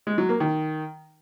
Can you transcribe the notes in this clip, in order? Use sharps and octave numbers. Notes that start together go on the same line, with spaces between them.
G#3
F#3
A#3
D#3